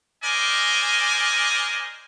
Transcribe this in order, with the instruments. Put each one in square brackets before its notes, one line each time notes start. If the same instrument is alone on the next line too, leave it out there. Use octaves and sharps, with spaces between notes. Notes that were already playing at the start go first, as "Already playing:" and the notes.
[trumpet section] A#4 C5 D5 D#5 G#5